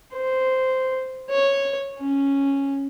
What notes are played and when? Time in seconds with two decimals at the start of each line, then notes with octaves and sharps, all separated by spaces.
0.14 C5
1.30 C#5
1.99 C#4